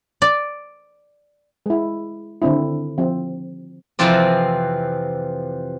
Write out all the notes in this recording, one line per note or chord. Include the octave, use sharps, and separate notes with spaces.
D5
G#3 E4
D3 D#3 C4 D4 E4
F3 C4
F2 C3 E3 F3 C4 D5